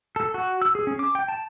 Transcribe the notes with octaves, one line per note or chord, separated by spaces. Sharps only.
A4
F#4
E6
G#4
C#4
D6
G5
A5